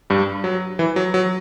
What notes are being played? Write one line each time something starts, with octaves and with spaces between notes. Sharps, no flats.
G2 G3
F#3
E3
F#3
F#3